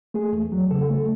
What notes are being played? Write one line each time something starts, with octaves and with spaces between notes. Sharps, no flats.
A3 G#4
E2
F#3
C#3 A4
A3